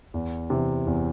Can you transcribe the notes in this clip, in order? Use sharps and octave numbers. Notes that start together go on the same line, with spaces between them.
E2
C3 E3
E2